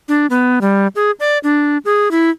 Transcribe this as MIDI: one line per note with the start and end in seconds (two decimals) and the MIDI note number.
0.08 0.27 62
0.30 0.59 59
0.61 0.87 55
0.96 1.11 68
1.20 1.38 74
1.44 1.78 62
1.85 2.11 68
2.11 2.30 64